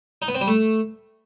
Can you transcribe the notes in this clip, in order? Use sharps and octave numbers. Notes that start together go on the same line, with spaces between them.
D#4
B3
C4
G3
A3